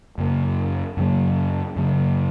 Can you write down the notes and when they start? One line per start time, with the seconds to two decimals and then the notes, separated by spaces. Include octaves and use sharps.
0.18 F#2 C#3 F#3 A#3
0.97 F#2 C#3 F#3 A#3
1.76 F#2 C#3 F#3 A#3